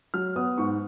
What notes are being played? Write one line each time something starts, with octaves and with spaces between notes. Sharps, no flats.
F#3 F6
B3 D#6
G#2 C#6